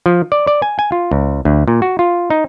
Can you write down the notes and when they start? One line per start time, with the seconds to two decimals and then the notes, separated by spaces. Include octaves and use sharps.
0.06 F3
0.32 D5
0.47 D5
0.62 G#5
0.79 G#5
0.92 F4
1.11 C#2
1.45 D2
1.68 A#2
1.82 F#4
1.99 F4
2.30 D#4